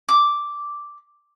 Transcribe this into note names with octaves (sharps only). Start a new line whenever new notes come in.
D6